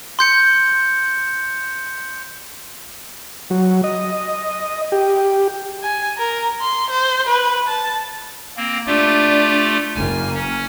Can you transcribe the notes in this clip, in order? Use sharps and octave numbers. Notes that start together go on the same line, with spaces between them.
C6 G6 C#7
F#3
D#5
G4
G#5
A#4
C6
C5
B4
A5
A#3 C4
A3 D4 F4 G4
F#1 A#3 G#5
C#4